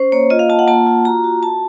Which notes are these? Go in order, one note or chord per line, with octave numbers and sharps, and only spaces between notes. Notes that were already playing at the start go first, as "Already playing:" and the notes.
Already playing: C#4 C5
A#3 C#5
F4 D#5
F5
F4 A5
F#5
A#3 A5
F4
F#4 A#5
F#4
F#4 A5